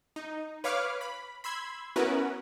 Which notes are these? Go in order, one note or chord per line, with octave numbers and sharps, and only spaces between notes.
D#4
B4 C#5 F5 D6 F6
B5
B5 C6 E6 G#6
B3 C#4 E4 F#4 A#4 B4